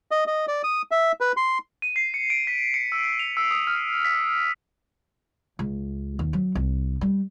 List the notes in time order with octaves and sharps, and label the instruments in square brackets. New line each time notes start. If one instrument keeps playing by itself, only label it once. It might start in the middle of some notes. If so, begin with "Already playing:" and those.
[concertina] D#5
D#5
D5
D#6
E5
B4
C6
[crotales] D#7
C7
C#7
D7
B6
C#7
E6
F7
E6
D#6
F6
B6
[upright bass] C#2
D#2
F#3
C2
G3